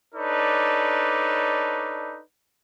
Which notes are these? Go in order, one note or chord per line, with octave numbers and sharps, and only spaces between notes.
D4 D#4 A4 B4 C#5 D5